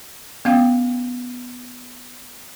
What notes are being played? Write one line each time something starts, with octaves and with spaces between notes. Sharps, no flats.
B3 C#4 F5 G5